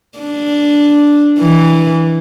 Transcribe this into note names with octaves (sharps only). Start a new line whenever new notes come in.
D4
E3